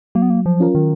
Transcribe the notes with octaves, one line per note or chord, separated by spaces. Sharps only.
F#3 A#3
B3
A#3
F3
C#4 F4 A#4
D#3